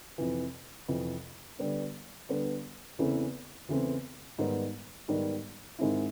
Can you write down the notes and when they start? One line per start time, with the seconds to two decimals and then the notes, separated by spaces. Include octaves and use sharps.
0.18 F2 C3 E3
0.88 F2 C3 E3
1.59 D3 G3 B3 D4
2.29 D3 G3 B3 D4
2.99 E2 C#3 E3 A3 C4
3.69 E2 C#3 E3 A3 C4
4.38 G#2 D#3 G3 B3
5.08 G#2 D#3 G3 B3
5.79 G#2 D#3 G#3 C4 E4